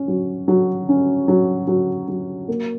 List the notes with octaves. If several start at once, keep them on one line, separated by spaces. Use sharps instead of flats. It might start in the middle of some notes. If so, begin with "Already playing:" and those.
Already playing: C#4
F#3
F#3
C#4
F#3
F#3
F#3
A#3